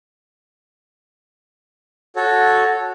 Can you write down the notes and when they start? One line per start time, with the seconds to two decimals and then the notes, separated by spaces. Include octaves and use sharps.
2.16 F#4 A4 C#5